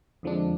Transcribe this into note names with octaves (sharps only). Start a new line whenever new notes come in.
F2 D3 F3 G#3 D4